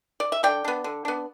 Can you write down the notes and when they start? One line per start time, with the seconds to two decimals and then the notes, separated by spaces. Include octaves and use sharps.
0.20 D5
0.32 E5
0.43 D3 D5 G5
0.64 B3 D4
0.84 D3
1.05 B3 D4